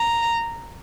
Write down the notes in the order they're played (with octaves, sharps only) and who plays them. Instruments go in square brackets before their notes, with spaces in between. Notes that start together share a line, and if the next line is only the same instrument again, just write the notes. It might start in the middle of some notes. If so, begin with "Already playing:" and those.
Already playing: [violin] A#5